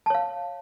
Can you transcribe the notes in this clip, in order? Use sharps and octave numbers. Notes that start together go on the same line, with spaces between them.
C#5 F5 A5